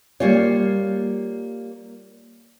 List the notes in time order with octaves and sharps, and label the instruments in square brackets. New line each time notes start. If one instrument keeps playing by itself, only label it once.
[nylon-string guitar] G3 A#3 F4 C#5